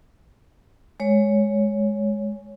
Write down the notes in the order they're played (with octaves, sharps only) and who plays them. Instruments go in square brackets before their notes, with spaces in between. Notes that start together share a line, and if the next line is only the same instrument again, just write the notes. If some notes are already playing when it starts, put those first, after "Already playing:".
[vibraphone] G#3 C#5